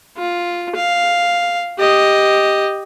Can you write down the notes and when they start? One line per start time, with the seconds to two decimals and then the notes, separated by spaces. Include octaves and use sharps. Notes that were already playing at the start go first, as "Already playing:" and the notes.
0.18 F4
0.75 F5
1.78 G4 D#5